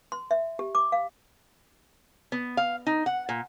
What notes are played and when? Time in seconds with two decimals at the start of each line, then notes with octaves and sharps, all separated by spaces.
0.12 C6
0.31 E5
0.59 G4
0.75 D6
0.92 F5
2.32 B3
2.57 F5
2.87 D#4
3.06 F#5
3.29 A#2